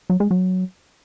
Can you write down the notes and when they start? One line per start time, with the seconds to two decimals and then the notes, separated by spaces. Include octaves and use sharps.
0.10 F#3
0.20 G#3
0.31 F#3